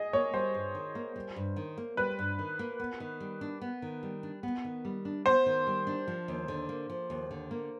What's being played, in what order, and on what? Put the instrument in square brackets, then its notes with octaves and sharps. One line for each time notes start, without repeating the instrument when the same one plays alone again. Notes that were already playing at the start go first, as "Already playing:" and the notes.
Already playing: [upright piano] G#4 D#5
[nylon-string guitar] A#3 [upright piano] C#5
[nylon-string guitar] G3 [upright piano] C5
[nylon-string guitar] G2
D#3
A#3
G3
G2
D#3
A#3
[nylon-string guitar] G3 [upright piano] B4
[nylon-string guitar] G2
D#3
A#3
B3
D#3
G3
D4
B3
D#3
G3
D4
B3
D#3
G3
D4
[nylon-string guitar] B3 [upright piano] C5
[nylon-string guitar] D#3
G3
D4
F3
D#2
D3
A#3
F3
D#2
D3
A#3